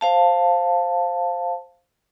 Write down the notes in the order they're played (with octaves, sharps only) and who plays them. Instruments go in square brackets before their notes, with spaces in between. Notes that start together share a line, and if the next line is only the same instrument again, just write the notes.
[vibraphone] C5 F5 A5